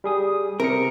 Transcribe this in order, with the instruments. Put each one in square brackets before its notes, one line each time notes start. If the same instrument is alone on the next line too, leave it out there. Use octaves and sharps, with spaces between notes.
[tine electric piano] G3 G#4 D#6
[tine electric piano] C3 C#7 [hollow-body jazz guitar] A#4